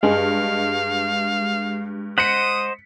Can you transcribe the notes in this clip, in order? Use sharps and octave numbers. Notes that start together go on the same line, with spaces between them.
G2 G#3 F5
C5 D#5 F#5 D#6 B6 C#7